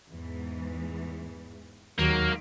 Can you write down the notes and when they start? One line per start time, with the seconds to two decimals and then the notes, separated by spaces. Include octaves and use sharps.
0.11 E2 G#2 E3
1.99 D#2 D#3 F#3 G#3 A#3